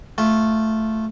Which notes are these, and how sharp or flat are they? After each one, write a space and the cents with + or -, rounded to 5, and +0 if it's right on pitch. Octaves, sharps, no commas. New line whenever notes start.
A3 +0 F4 +0